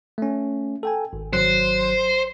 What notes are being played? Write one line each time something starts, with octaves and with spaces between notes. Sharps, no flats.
A3 C#4
A4 G5 G#5
G#1
G#1 F#3 C5 F#6